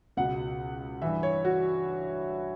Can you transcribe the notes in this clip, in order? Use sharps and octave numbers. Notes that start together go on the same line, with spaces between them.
C#2 B2 F#5
G2 E3 E5
C#5
F#4